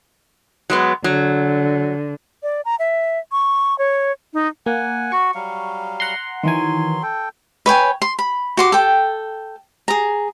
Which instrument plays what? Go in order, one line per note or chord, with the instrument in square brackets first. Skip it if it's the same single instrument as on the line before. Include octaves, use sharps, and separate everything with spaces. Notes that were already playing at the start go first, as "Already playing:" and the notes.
[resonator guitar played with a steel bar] F#3 G#3 B3
[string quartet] D3 [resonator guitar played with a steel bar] F#3
[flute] D5
A#5
E5
C#6
C#5
D#4
[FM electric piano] A#3 [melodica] F#5 G#5
[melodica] F#4 [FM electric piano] C#6
[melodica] F#3 G3 F5
[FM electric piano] F#5 A#5 C6
[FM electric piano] D#3 E3 G#5 [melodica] F#3 C6
[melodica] A4 G5
[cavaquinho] B4 C#5 G5 G#5
C6
B5
F#4 C6 D6
A4 G5
G#4 A#5